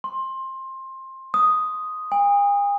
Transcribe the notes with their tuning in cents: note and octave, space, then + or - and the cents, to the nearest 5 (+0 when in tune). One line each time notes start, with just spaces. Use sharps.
C6 +20
D#6 +0
G#5 -45